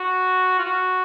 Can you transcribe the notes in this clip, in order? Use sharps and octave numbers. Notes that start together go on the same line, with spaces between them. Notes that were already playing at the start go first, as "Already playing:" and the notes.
Already playing: F#4
F4
F#4